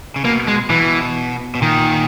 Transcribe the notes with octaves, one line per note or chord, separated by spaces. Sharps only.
C#3
B2 A#3
G#3
B2 E3
B2
A#2 D#3